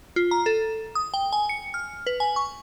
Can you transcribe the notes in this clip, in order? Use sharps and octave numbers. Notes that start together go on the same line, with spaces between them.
F4
A#5
A4
D#6
G5
G#5
C#7
F6
B4
G#5
C#6